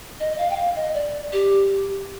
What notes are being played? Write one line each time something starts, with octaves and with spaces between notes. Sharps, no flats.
D#5
D#5
F5
G5
F5
D#5
D5
G4